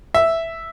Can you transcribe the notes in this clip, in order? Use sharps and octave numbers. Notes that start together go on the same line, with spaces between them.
E5